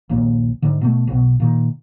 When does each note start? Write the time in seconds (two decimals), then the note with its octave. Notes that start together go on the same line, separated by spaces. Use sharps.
0.09 A#1 D#2 A#2
0.62 G#2 D3
0.81 B2 G#3 A3
1.07 B1 B2
1.40 A#2 D#3